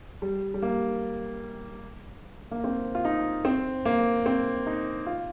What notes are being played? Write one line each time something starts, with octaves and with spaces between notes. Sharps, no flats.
G3
G3
A#3
A#3
C4
F4
D#4
C4
A#3
C4
D#4
F4